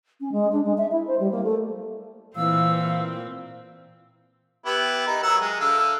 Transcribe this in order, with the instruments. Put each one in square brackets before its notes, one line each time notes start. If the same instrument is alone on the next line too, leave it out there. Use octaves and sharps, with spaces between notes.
[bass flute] C#4
G#3
D4
G#3
E5
E4
C5
G3
A#3
A3
[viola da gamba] A#2 C4 [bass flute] E3 [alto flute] F5 [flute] E6
[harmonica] B3 E4 G4
D#4 A#4
F#3 F#5 E6
G#3
D3 E5 F5